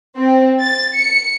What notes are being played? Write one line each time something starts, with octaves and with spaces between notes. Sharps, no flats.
C4
A6
C#7